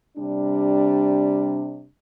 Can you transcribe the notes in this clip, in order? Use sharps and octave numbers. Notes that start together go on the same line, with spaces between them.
C3 G3 D4